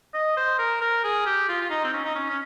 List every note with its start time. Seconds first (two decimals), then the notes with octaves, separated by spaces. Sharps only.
0.14 D#5
0.37 C5
0.59 A#4
0.81 A#4
1.04 G#4
1.26 G4
1.49 F4
1.61 F4
1.70 D#4
1.84 C4
1.94 C#4
2.05 D#4
2.16 C#4
2.29 C#4